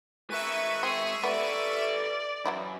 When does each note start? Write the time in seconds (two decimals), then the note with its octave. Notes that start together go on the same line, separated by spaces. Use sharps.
0.30 G#3 A#4 B4 E5 C#6 D#7
0.83 C4 G#4
1.24 B3 A4 B4 D5
2.45 F#2 E3 F#3 E4